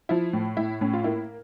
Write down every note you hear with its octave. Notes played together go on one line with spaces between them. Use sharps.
F3 E4
A2
A2 E4
A2 C#4
F4
A#3 E4